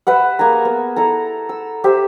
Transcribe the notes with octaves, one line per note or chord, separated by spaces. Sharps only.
B4 E5 F#5
A#3 G#4 G#5 A#5
B3
E4 A4 A#5
E6
G4 C5 E5